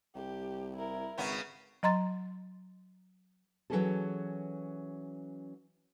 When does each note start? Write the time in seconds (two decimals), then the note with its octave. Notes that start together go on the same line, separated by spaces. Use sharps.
0.16 C2 G4
0.76 E4 A#4
1.18 G#1 C#3 B3 C#4
1.83 F#3 D#5 A#5 C6 A6
3.70 E3 F#3 C4 C#4 G#4 A4